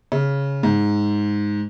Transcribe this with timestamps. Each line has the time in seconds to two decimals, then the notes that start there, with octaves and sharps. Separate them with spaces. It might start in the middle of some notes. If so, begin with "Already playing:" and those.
0.12 C#3
0.63 G#2